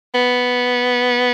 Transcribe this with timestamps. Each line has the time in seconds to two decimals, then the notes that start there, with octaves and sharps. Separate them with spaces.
0.15 B3